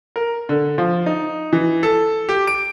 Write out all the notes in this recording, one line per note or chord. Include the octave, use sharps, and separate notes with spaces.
A#4
D3
F3
D#4
E3
A4
G4
D7